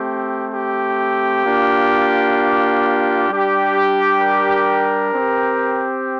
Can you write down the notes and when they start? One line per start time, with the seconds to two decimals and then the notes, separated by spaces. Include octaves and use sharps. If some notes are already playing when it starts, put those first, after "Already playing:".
Already playing: A3 C4 G4
0.52 G4
1.44 A#3 D4 F4
3.30 G3 D4 G4
4.22 A#4
5.14 C4 G4